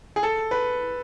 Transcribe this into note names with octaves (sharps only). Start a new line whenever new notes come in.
G#4
A4
B4